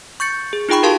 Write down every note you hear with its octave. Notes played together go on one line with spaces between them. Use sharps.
C#6 G6 A6 C#7
G#4
D#4 F4 G#4 G5 B5 C#6
F#4 G4 A#4 F5 A5 C6